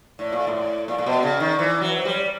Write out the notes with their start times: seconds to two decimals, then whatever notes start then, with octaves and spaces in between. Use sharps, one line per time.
0.19 A2 D5
0.32 A#2
0.47 A2
0.88 A#2 D5
0.98 A#2
1.06 B2
1.23 C#3
1.40 D#3
1.59 E3
1.81 F#3
1.89 B4
1.98 C5
2.05 G3 C#5
2.18 D5